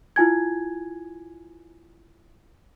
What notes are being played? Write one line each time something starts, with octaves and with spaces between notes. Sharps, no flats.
E4 F4 G#5 G#6